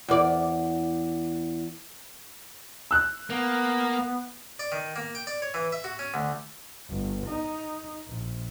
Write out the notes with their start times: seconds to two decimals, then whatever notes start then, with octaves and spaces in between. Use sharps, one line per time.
0.09 E2 D5
2.91 E6 F#6
3.30 A#3 B3
4.59 D5
4.72 D#3
4.96 A#3
5.15 G5
5.27 D5
5.42 C#5
5.54 E3
5.72 E5
5.84 F#4
5.99 C#4
6.14 D2
6.89 G1
7.27 D#4
8.08 A#1